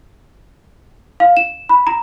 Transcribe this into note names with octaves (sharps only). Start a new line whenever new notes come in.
F5
E7
B5
A#5